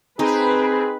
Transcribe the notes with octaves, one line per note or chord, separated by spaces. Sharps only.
C4 D#4 G#4 B4 D#5